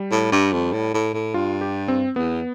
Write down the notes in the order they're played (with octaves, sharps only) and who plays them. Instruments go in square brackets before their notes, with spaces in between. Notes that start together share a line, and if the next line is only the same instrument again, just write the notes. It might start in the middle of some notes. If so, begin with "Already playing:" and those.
Already playing: [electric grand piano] G3
[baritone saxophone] A2
G2
F2
A2
A2
A2
[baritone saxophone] G2 [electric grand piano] F4
[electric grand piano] G4
C4
[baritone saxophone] E2 [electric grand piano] B3